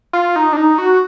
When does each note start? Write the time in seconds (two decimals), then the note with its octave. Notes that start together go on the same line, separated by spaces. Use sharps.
0.13 F4
0.36 D#4
0.53 D4
0.57 D#4
0.78 F#4